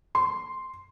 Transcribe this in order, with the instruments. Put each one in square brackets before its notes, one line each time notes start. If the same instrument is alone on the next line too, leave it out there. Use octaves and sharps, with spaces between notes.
[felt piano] C6